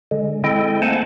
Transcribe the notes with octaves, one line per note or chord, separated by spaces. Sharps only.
D3 G#3
G#3 C4 E4 A4 D#5 G5
A3 A#3 C5 F#5 G#5 A5